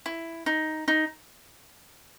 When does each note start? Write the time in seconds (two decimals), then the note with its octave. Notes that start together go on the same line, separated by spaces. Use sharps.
0.06 E4
0.46 D#4
0.88 D#4